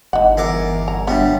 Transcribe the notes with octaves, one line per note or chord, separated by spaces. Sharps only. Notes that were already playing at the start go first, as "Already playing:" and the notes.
G1 D#4 F#5
E2 A#4 D6
A#5
B2 G3 B3 D4 C#5 E5